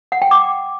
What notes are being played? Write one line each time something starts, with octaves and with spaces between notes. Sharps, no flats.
F#5
G5
D6